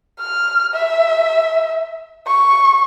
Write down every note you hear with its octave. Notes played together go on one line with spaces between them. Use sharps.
F6
E5
C#6